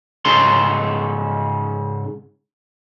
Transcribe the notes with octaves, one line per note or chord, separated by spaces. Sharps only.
G#2 C#3 A4 C6